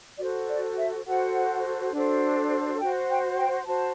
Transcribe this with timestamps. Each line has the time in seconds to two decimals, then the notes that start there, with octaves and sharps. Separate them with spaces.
0.18 F#4 A4 C5 D5
0.48 D5
0.77 E5
1.06 F#4 A4 C5 F#5
1.92 D4 F#4 A4 C5
2.79 F#4 C5 G5
3.09 G5
3.37 G5
3.66 F#4 C5 A5